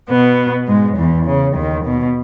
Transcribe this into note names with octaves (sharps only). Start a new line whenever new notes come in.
B2 B3
G#2 G#3
E2 E3
C#3
D#2 D#3
B2